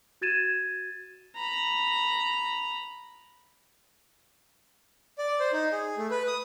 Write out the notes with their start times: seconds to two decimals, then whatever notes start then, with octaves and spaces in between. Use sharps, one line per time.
0.21 F#4 G#6 A6 D#7 E7
1.36 A#5 B5
5.19 D5
5.40 C5
5.53 D#4
5.72 G#4
5.97 A3
6.11 B4
6.27 D#6